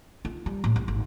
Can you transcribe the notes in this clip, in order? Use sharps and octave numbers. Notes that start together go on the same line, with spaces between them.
F4
G3
A2
C2
G#1